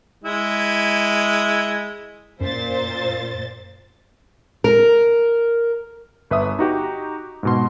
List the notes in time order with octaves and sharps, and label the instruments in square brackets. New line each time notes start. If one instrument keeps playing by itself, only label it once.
[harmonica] G#3 E4
[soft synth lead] F#2 [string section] A#2 C5 A6
[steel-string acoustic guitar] A#4
[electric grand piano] G1 B4 E5 D#6
D#4 F#4 G4
G#2 B2 C6